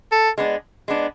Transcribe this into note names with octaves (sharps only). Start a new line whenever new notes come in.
A4
G#3 B3 D4
G#3 B3 D4